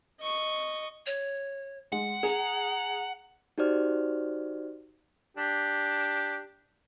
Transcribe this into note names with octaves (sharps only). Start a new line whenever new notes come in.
D#5 C#6
C#5
G#3 F#5
G#4 A#5
D#4 F#4 G4 C5 D5 F6
D4 G4